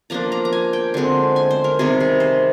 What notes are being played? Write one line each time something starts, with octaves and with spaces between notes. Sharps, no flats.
F3 A#3 D4 A#5
A#5
A#5
G#5
G5
D3 G#3 C4
G#5
C5
A#4
C3 D#3 G3 G#4
G#4
C5